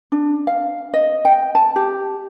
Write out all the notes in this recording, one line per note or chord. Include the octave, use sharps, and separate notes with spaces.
D4
F5
D#5
G5
A5
G4